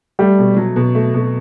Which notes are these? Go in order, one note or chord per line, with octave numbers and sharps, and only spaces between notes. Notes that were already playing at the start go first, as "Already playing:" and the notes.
G3 A3
B2
F#3
B2
A3
B2